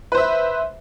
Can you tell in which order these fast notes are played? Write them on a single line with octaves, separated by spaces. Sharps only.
B4 C5 E5